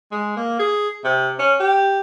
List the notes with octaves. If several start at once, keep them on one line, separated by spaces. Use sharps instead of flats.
G#3
A#3
G#4
C3
C#4
G4